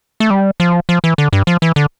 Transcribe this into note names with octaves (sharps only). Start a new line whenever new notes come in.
A3
G3
F3
F3
E3
D3
G2
F3
E3
D3